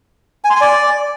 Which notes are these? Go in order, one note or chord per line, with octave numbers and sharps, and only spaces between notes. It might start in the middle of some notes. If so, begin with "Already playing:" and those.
G#5
C6
G#5
D5